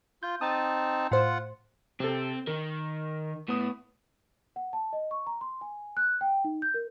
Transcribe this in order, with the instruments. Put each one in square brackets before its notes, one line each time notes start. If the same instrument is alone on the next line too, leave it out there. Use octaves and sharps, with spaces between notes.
[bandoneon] F4 [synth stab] G6
[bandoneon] C4 D#4 A5 [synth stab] D#6 A6
[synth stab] A2 C5 [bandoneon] F4 F#5
[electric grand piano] C3 A4 [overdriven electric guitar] C4
[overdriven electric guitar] D#3 [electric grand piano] A#4
[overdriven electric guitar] A2 [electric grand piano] B3 D#6
[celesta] F#5
A5
D#5
C#6
A#5
C6
G#5
F#6
G5
D#4
G6
A#4